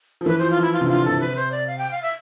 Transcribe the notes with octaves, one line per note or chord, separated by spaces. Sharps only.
F3
E3 B4
F3 C5
F4
F3 E4
F4
C3
D3
F4
C3 A4
B4
C5
D5
F5
G5
F5
E5